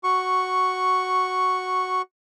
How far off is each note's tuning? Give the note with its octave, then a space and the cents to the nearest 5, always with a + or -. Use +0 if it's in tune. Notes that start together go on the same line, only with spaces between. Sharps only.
F#4 +0 C#6 +0